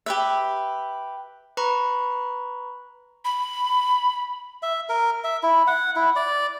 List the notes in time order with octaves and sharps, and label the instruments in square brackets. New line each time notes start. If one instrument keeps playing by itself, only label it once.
[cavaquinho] G4 B4 E5
[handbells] B4 A#5 B5 C#6
[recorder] B5
[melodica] E5
A#4
E5
E4
F#5
E4
D5